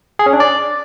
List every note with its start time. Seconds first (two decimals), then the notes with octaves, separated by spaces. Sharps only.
0.19 G#4
0.26 C#4
0.33 D4
0.40 D5